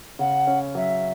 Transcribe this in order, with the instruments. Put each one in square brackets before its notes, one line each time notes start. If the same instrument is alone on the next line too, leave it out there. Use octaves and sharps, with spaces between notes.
[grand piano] C#3 [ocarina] F#5
[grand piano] C#4
[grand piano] F#3 [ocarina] E5